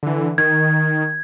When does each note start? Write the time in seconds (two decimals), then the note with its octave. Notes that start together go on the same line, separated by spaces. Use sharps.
0.03 D3 E3
0.38 D#3 G#6